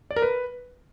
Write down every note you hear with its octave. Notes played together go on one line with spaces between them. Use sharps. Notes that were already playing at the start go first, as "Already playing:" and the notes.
D5
A#4
B4